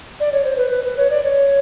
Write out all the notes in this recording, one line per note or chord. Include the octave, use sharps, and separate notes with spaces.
D5
C#5
C5
B4
B4
B4
C#5
D5
C#5